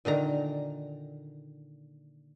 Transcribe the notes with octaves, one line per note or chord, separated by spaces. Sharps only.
A#2 D3 D#3 A#5